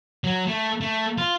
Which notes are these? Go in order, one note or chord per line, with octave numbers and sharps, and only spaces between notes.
F#3
A3
A3
F4